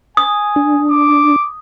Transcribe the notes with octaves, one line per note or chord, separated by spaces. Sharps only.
G#5 D#6
D4
D6